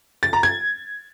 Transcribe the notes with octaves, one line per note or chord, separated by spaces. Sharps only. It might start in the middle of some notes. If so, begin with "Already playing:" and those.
A6
A#5
G#6